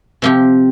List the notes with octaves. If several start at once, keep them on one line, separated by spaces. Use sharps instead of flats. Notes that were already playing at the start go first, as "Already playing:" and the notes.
C3 F3 C4 G4